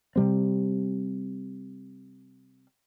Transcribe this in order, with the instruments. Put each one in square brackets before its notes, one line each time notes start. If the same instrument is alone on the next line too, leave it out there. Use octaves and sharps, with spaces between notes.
[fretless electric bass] C3 G3 C4